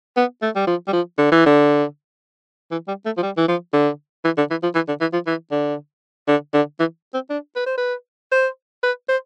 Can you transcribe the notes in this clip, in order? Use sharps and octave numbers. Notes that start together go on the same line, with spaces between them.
B3
A3
G3
F3
G3
F3
D3
E3
D3
E3
G3
A3
F3
G3
E3
F3
D3
E3
D3
E3
F3
E3
D3
E3
F3
E3
D3
D3
D3
E3
C4
D4
B4
C5
B4
C5
B4
C5